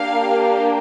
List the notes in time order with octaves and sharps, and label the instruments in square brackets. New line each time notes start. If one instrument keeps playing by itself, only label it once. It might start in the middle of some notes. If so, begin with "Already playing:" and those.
Already playing: [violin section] A#3 D4 G4 F5